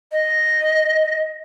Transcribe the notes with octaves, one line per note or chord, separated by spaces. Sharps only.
D#5